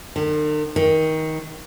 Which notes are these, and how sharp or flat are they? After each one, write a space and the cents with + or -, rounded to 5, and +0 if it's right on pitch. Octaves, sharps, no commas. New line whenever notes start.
D#3 -45
D#3 +20